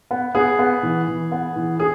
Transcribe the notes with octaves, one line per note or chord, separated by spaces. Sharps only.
B3
B3 G#4
B3
E3
E3
B3
E3
G#4